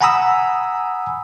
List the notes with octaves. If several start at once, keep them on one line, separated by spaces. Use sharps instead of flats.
F#5 G#5 A#5 B5 D#6 E6